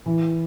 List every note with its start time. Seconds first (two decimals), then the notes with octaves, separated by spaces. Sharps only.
0.06 E3